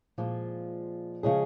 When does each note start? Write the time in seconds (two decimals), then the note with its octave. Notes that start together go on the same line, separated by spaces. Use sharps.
0.18 A#2 F3 G#3
1.23 C#3 F3 G#3 C#4 G#4